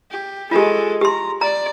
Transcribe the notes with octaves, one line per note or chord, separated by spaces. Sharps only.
G4
G#3 F4 G4 A4
G4 A#5 C6
D5 A#5